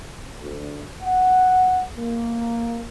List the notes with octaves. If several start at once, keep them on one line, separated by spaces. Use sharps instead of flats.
D2
F#5
A#3